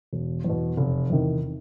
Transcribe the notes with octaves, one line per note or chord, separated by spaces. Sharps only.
E1
E2 B2
F1
E2 C3 D#3